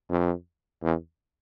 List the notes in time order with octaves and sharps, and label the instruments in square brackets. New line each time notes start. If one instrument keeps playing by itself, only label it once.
[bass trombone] F2
E2